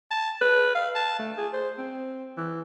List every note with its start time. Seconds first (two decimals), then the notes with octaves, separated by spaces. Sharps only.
0.11 A5
0.41 B4
0.75 F5
0.95 A5
1.19 A3
1.37 G#4
1.53 C5
1.78 C4
2.37 E3